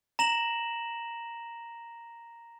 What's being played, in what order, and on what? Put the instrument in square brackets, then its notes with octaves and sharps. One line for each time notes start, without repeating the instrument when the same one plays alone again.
[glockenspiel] A#5 A#6 E7 F#7